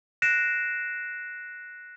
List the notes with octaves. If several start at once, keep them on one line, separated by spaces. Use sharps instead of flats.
F#6 A#6 C7 D7 E7